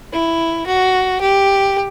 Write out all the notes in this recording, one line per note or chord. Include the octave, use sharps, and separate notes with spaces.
E4
F#4
G4